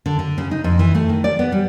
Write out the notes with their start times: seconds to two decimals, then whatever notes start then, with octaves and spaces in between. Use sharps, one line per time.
0.06 D3
0.19 D3
0.38 C#3
0.51 D#4
0.64 F2
0.79 E3
0.95 A3
1.09 D#3
1.24 D5
1.39 B3
1.52 G3